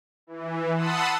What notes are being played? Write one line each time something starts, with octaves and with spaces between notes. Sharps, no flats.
E3
F#5 A5 B5 C6 D#6 E6